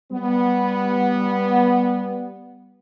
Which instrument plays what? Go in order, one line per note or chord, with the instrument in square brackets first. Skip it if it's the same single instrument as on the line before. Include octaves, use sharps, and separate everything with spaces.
[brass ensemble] G3 B3